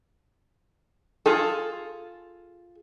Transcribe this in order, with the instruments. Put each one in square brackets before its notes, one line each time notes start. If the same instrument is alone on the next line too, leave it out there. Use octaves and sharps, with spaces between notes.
[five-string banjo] F4 G#4 A4